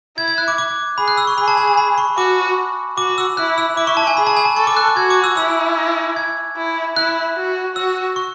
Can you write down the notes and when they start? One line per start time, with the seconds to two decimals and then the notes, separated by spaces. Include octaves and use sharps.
0.18 E4 G#6
0.28 G#6
0.38 F#6
0.48 D6
0.58 D6
0.98 G#4 B5
1.08 F#6
1.17 E6
1.27 C#6
1.38 G#4 B5
1.48 A5
1.57 G#5
1.68 A5
1.77 B5
1.98 C#6
2.17 F#4 D6
2.97 F#4 D6
3.18 E6
3.37 E4 F#6
3.58 E6
3.77 E4 D6
3.87 C#6
3.97 A5
4.07 G#5
4.17 G#4 B5
4.27 A5
4.37 G#5
4.45 A5
4.56 A4 C#6
4.67 D6
4.77 F#6
4.87 F#6
4.97 F#4 G#6
5.10 D6
5.24 E6
5.37 E4 E6
6.16 G#6
6.56 E4
6.96 E4 F#6
7.37 F#4
7.76 F#4 E6
8.16 C#6